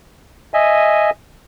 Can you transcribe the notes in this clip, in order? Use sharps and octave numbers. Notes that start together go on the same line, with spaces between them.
D#5 E5 G#5